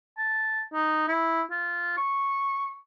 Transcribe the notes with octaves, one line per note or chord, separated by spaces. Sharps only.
A5
D#4
E4
F4
C#6